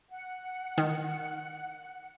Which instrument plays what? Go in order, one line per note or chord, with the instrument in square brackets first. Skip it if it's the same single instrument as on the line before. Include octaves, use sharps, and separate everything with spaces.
[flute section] F#5
[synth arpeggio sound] D#3